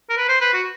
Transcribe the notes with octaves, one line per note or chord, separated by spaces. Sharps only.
A#4
B4
C5
B4
F#4